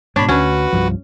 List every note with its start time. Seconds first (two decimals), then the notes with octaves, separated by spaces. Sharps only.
0.16 G#2 B2 D4 C#5 B5
0.29 D2 C#4 F#4 B4
0.72 C2 G2 F3